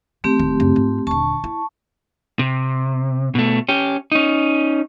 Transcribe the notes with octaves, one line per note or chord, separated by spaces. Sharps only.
D#3 A3 C4 G4
D1 D#3
F#2 C#3
G#2 F4
D#1 D3 A5 C#6
E4
C3
B2 A3
C#4 G4
C#4 D#4